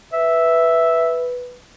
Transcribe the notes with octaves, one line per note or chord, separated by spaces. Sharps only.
B4 E5